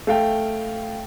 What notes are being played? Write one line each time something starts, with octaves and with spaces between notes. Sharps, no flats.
A3 F5 G5